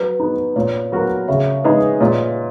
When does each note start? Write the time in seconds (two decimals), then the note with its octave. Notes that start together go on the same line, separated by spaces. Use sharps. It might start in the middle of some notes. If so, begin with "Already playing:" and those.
Already playing: F#3 B4
0.20 B3 D#4
0.56 A#2 C#5
0.92 F#3 B3 F#4 A#4
1.28 C#3 C#5 E5
1.64 G#3 D#4 G#4 B4 D#5
2.00 A#2 C#5